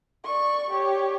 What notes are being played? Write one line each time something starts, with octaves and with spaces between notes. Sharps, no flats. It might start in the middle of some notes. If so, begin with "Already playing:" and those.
D5 C#6
G4 C#5